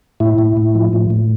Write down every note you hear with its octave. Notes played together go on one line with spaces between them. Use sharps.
A2 E4
A2
A2
F3
A2
A2